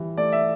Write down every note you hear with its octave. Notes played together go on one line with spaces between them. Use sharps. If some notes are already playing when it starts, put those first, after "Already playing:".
Already playing: E3 G3
A3 D5
E5